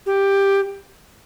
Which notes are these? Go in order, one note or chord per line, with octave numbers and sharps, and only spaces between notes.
G4